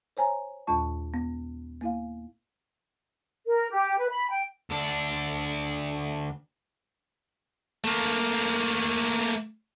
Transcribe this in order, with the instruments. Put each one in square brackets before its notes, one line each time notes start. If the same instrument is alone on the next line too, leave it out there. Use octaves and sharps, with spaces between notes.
[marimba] C5 C#5 G#5 A#5
D#2 A#2 G#3 F4 A5 C#6
B3
A#3 E4 F5
[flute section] A#4
G4
B4
B5
G5
[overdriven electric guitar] D2 D4
[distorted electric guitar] A3 A#3